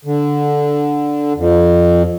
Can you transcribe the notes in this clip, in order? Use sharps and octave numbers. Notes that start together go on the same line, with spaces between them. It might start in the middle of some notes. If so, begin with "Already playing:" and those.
D3
F2